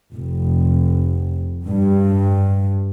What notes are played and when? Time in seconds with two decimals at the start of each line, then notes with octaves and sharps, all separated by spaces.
0.14 F1
1.66 G2